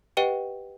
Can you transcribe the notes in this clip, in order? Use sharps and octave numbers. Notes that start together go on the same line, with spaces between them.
G4 B4 D#5 F#5 G5